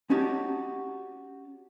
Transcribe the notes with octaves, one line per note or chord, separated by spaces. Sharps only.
C#4 D#4 F#4 G4 A5